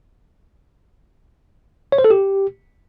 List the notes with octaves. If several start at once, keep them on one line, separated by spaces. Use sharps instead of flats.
C#5
C5
A4
G4